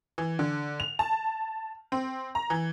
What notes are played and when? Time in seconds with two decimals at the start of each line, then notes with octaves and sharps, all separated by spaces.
0.18 E3
0.39 D3
0.80 F7
0.99 A5
1.92 C4
2.35 A#5
2.50 E3